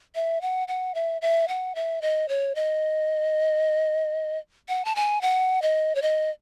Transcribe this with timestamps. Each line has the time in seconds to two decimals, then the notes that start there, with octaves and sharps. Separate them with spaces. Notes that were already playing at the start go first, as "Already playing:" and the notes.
0.15 E5
0.41 F#5
0.68 F#5
0.95 E5
1.22 E5
1.48 F#5
1.75 E5
2.02 D#5
2.29 C#5
2.55 D#5
4.69 F#5
4.85 A5
4.95 G#5
5.22 F#5
5.62 D#5
5.95 C#5
6.02 D#5